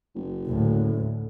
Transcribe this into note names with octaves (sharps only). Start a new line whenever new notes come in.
F#1
D2 A2